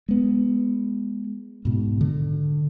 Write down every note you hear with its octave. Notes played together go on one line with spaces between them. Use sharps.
G#3 B3
G#2 B2
D3